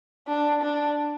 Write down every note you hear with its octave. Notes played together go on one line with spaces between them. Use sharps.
D4
D4